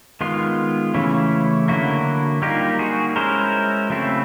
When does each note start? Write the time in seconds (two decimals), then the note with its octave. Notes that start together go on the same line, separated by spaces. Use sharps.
0.21 D#3 G#3 B3 F4
0.94 C#3 E3 A3 C#4 E4
1.68 D3 F#3 A#3 E4 F#4
2.42 G3 A#3 D#4 F4 G4
2.79 F#4 G#4
3.16 G#3 C#4 E4 A#4 C5
3.90 C#3 F#3 A3 C4 E4